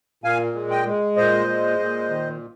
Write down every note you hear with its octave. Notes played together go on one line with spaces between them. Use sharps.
A#2 F5 G#5
G#3
D#5 G5
G#3
A#2 C5 D#5
G#3
A#2
D#3